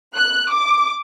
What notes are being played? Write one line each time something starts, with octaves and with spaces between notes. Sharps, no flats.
F#6
D6